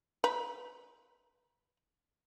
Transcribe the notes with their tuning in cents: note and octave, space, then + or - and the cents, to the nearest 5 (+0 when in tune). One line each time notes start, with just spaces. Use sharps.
B4 +0 A#5 +30